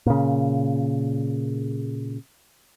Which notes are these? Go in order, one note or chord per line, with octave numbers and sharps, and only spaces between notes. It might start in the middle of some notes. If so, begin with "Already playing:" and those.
A#2 C#3